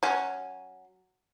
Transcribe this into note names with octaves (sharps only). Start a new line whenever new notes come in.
F#3 C#4